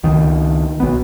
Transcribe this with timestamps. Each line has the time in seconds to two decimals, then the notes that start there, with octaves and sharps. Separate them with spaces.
0.04 C#2 D#3
0.80 B1 B3